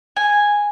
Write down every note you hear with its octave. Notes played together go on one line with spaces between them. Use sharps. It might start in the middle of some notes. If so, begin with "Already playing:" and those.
G#5